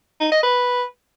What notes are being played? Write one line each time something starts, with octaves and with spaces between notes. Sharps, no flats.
D#4
D#5
B4